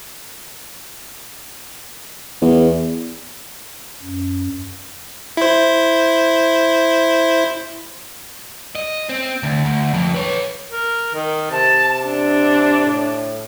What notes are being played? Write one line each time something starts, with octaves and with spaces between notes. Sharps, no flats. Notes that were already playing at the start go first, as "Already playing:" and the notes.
E2
F#2
E4 C5
D#5
C4
D2
D2
F2
B4 C#5
A#4
D#3
C3 A5
D4
A2